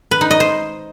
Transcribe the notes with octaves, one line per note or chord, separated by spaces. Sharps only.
B4
D#4
D#5
C5